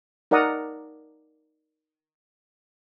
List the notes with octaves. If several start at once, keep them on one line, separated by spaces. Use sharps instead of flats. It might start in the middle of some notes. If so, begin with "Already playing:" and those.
D#4 A#4 D5 F#5 A#5 D#6